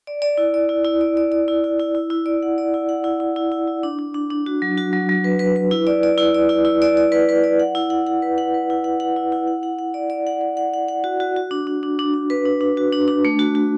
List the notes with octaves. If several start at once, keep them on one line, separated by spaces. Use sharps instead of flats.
D5
D5
E4
D5
E4
E4
D5
D5
D5
E4
E4
E4
E4
E4
D5
F#5
D5
E4
F#5
E4
E4
E4
E4
E4
D4
D4
D4
D4
F#4
F#3
F#4
F#3
F#3
B4
B4
B4
E4
D5
D5
E4
D5
E4
E4
D5
D5
B4
B4
D5
F#5
E4
F#5
F#5
B4
F#5
B4
E4
F#5
F#5
E4
E4
F#5
F#5
F#5
D5
D5
F#5
F#5
F#5
F#5
F#5
F#4
F#4
F#4
D4
D4
D4
D4
D4
B4
D4
D4
F#4
D4
D4
A3
F#4
F#4